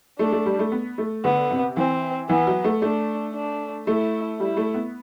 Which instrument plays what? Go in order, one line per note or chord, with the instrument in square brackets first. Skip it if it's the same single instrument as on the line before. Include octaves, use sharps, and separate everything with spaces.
[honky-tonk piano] A3 [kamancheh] D4
[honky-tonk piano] A3
G3
A3
B3
A3
[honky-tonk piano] D3 [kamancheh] B3
[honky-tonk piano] C3
[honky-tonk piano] E3 [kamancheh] C4
[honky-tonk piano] E3 [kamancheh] B3
[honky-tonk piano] F#3
A3
[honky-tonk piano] A3 [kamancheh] D4
[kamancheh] D4
[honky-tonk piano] A3 [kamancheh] E4
[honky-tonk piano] G3 [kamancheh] E4
[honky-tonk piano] A3
B3